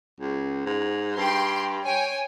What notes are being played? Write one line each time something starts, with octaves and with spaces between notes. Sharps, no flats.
C#2
G#2
G2 G5 C6
C#5 G5 G#5